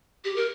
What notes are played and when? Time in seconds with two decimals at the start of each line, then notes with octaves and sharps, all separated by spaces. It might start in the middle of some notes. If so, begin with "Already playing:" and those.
0.24 G4
0.36 A#4